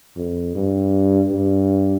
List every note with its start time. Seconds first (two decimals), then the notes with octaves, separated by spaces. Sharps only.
0.16 F2
0.55 G2
1.31 G2